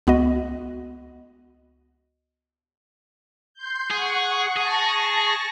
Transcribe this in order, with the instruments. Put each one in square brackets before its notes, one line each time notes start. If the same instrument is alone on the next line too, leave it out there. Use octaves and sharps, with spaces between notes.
[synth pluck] C#2 B3 F#4 D#5
[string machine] C6 G6
[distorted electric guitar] G#4 [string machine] F#5 C#6
[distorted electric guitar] G#4 [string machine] A5 C#6 A#6